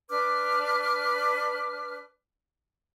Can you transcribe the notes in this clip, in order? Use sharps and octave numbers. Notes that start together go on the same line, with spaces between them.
D4 B4 D6 F6